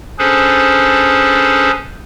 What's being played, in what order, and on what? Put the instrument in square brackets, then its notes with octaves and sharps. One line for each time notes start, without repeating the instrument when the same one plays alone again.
[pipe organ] C#4 D4 G#4 A4 B4 C5